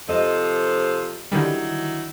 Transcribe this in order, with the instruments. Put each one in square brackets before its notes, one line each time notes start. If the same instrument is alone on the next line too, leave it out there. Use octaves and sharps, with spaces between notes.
[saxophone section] C3 F3 A4 [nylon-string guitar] D#5
[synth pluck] D3 D#3 G3 [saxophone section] F#3 D#4 E4